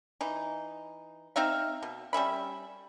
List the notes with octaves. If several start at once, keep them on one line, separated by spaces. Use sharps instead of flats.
E3 D#4
C4 D#4 E5 F5
B2
G3 C#4 E5 B5